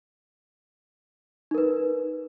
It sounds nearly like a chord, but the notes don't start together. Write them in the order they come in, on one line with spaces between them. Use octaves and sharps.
D#4 A#4 B4